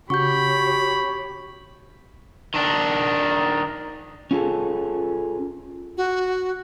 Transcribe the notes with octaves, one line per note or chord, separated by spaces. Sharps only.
C#3 F#4 G4 C#5 B5 C#6 G6
D#3 D4
C#4 F4 G#4 A4
F#4